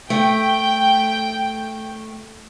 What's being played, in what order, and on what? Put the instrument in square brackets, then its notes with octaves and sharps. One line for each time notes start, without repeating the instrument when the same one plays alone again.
[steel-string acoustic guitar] A3 [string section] G5